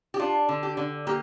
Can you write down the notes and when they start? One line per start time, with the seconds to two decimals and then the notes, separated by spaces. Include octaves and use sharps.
0.14 G4
0.19 D4 F4
0.49 D3
0.63 G4
0.77 D3
1.07 A#3 G4